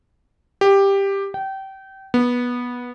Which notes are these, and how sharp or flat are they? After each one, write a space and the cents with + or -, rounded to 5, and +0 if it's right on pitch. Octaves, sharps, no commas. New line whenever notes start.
G4 +10
G5 -25
B3 -15